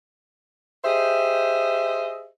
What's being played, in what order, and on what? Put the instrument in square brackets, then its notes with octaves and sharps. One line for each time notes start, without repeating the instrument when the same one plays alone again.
[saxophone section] G4 G#4 C5 D#5 E5